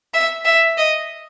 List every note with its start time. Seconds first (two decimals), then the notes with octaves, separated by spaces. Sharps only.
0.14 E5
0.45 E5
0.77 D#5